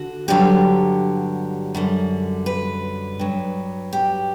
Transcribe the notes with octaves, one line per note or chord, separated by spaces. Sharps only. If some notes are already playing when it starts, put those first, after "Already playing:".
Already playing: D3 F#4
G2 D3 F#3 G4
F#2 D3 G3
B4
G2 F#3
G4